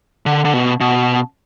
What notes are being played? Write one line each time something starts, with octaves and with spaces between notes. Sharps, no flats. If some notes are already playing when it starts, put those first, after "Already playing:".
D3
D3
B2
B2